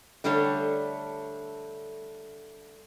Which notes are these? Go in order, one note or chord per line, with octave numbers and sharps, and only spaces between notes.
D3 G3 A3 A4 C#5